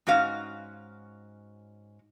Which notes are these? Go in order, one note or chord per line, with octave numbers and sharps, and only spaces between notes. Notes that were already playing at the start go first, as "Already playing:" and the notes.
G#2 C#4 F#4 F5